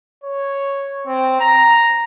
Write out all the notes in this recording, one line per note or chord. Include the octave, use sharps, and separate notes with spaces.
C#5
C4
A#5